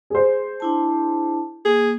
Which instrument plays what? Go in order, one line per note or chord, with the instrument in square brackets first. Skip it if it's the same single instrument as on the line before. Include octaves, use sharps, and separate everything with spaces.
[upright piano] G#4 C5
[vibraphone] D4 E4 A5
[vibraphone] A#3 [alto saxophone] G#4